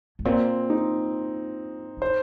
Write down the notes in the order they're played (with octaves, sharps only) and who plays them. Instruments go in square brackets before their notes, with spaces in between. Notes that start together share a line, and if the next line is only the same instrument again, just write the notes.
[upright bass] G#2
[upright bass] A#2 [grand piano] C4
[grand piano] D#4
[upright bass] G2
[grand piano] C5